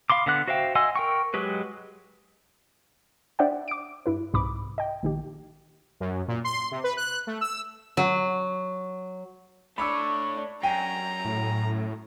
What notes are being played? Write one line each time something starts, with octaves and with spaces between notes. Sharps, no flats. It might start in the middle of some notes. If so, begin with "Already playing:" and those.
F5 B5 C6 D6
D3 B3 F#5 F#6
F#4 C5 E5 F5 G5
D#5 F#5 G#5 C6 E6
A#4 G5 C#6
F#3 G#3 G4 B4
D4 C5 D5 E5 F#5 G5
D6 D7
G2 E4 B4
C2 G#2 B5 D6
D#5 G5
A#1 D#3 G4
F#2
A#2
C6
C3
B4
F#6
A3
E6
F#3
A3 D4 C#5 B5 D6 E6
F#2 G5 G#5 A#5 D#7
A2